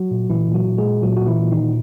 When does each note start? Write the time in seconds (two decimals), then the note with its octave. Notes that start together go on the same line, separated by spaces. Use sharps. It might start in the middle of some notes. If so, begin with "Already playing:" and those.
Already playing: F#3 F#4
0.11 A#2
0.30 A#2 E3 E4
0.48 A#2
0.54 F#3 F#4
0.67 A#2
0.78 G#3 G#4
0.85 A#2
1.02 A#2 F#3 F#4
1.17 A#2 F#4
1.27 E3 E4
1.39 A#2
1.51 D#3 D#4
1.58 A#2